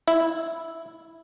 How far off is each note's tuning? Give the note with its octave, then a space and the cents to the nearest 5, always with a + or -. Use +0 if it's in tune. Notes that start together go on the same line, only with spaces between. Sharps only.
E4 -5